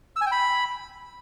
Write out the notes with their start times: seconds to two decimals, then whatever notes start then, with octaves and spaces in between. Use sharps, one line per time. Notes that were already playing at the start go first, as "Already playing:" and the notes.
0.16 E6
0.21 G#5
0.26 G5
0.31 B5